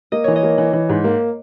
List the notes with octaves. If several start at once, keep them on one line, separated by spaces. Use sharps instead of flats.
A#3 D#5
E3 C#5
D#5
A#3
E3
E3
G#2
A#3